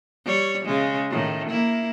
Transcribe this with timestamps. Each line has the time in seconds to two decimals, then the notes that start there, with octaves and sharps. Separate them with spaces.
0.25 G3 C#5
0.65 C#3 G#3
1.10 A2 D#3
1.49 A#3 E4